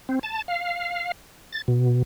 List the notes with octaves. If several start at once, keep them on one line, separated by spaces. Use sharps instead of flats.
C4
A5
F5
A6
B2